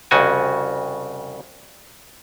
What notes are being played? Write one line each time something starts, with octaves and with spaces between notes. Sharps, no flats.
C2 F2 C#3 F#4 G#5